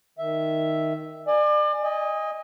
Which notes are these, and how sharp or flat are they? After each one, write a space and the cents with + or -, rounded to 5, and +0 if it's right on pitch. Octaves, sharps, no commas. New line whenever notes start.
D#3 +0 E5 +0
D5 +35 G#5 +0
D#5 +15 G#5 -30